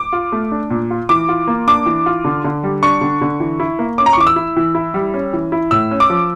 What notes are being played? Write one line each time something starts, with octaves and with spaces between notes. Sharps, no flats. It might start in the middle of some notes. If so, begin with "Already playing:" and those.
Already playing: D6
F4
A3
D4
A#2
F4
E3 D6
F4
A#3
D4 D6
E3
F4
D3
D3
G3
D4 C#6
D3
D3
E3
E4
A#3
C#4 D6
A#5
C#6
E3 D6
E6
E4
E3
E4
G3
C#4
E3
E4
A2 E6
C#4
D6
F3